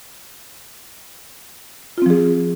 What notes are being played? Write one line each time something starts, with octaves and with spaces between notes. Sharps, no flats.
F3 C4 F4 G#4